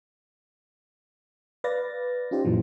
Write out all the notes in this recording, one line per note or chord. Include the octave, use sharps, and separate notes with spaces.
B4 D5 F5 A6 A#6
C#4 D#4 F4 G4 C5
F#2 A#2 E3 F#3